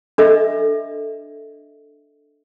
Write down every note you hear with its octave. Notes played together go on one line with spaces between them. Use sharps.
D4 A4 D#5 E5